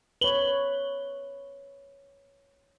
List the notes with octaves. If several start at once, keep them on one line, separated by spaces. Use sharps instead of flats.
B4 C#5 F#7 G7